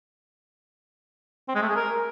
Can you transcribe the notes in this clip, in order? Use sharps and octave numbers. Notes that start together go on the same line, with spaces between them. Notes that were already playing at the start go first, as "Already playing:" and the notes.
C4
G#3
A3
G#4
A#4